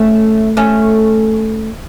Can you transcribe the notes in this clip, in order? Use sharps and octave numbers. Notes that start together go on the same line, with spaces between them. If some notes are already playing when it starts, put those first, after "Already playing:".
Already playing: A3 C#4
A3 C#4